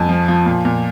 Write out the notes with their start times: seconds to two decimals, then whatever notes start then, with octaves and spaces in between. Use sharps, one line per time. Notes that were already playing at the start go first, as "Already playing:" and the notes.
Already playing: F2 G#5
0.09 F3
0.28 F3
0.46 A#2
0.65 A#2